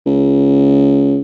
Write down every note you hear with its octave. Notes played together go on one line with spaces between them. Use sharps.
C#2